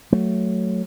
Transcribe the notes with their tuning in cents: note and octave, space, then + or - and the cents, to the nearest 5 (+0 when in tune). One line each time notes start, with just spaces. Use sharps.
F#3 +0 A3 +0